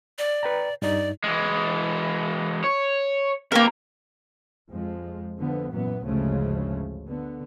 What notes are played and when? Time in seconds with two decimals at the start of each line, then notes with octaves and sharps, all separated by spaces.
0.19 D5
0.43 B4 G5 A#5
0.82 G2 D#4 D5
1.24 E3 G#3
2.64 C#5
3.52 B2 A#3 G4 A#4
4.70 F2 F3 G#3
5.39 D3 F3 B3
5.71 F#2 A#2 E3 B3
6.05 G#1 D2 C#3 F3 G#3 A3
7.07 D3 B3